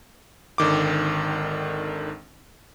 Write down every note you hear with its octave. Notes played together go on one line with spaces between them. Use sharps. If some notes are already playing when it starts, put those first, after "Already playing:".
G#1 D3 D#3 D6